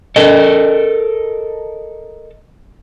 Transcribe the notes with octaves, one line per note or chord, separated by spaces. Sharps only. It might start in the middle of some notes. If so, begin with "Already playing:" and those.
A4 A#4 D#5